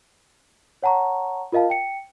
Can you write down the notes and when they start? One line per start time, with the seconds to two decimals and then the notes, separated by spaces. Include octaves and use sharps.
0.83 C#5 F#5 A5 A#5 C#6
1.52 F4 A#4 D#5 F5 A5
1.70 G5 C#7